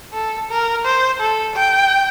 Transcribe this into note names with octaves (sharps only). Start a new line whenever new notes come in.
A4
A#4
C5
A4
G5